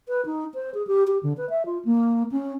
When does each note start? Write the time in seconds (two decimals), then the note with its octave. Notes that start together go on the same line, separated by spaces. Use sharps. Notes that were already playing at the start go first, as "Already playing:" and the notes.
0.08 B4
0.26 D#4
0.54 C5
0.74 G#4
0.87 G4
1.07 G4
1.23 D3
1.37 B4
1.50 E5
1.66 F4
1.85 A#3
2.32 C#4